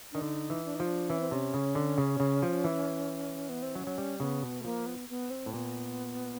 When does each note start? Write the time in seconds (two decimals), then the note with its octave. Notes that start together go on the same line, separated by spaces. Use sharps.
0.12 D#3 D4
0.21 D3 D#4
0.50 E3
0.65 D4
0.75 F3 D#4
0.86 D4
1.10 E3 C#4
1.20 C4
1.31 C3 C#4
1.54 C#3
1.75 D3
1.98 C#3
2.20 C#3
2.43 F3
2.64 E3
3.49 B3
3.63 C4
3.75 F#3 C#4
3.87 F#3
3.98 G3
4.20 C#3 B3
4.42 B2
4.61 A3
4.64 F3 A#3
4.87 B3
5.09 B3
5.30 C4
5.46 A2
5.53 A#2 B3